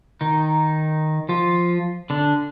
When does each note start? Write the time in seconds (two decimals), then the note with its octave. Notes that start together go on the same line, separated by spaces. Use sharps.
0.21 D#3 D#4
1.29 F3 F4
2.10 D3 D4